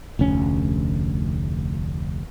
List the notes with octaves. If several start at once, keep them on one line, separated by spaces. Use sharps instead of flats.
F1 D2 C#4